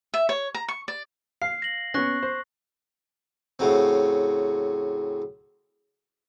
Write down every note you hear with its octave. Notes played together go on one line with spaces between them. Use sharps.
E5
C#5
A#5
C#6
D5
F5 C7
A#6 F#7
B3 C#4 C#6 F#6 A#6
C5
A2 C#3 F#3 C4